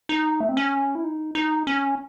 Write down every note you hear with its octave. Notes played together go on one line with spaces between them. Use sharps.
D#4
A3
C4
C#4
E4
D#4
D#4
C#4